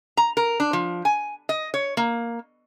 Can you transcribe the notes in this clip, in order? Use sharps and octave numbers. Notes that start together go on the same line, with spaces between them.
A#5
A#4
D4
F3
G#5
D#5
C#5
A#3